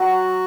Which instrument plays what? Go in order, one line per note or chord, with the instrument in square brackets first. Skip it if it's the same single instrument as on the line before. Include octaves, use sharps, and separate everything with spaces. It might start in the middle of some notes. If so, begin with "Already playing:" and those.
Already playing: [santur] F#3 [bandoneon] F#4